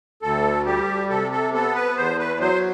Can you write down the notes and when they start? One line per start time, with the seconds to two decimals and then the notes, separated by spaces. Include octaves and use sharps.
0.22 D2 A4
0.66 G3 G4
1.10 C3 A4
1.32 A4
1.54 B3 A4
1.75 B4
1.97 E2 C5
2.19 B4
2.40 F#3 C5